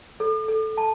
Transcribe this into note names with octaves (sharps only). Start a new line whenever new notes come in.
A4
A4
A5